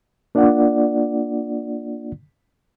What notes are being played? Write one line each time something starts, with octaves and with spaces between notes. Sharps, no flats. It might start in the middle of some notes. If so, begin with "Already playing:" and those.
A#3 D4 F4 D5 F#5